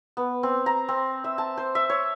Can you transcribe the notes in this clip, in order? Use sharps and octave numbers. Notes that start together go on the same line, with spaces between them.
B3
C4
A#5
C4
E5
A5
C5
E5
C#5